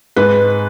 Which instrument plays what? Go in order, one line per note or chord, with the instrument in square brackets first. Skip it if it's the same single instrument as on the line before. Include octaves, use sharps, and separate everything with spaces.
[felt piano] G#2 B4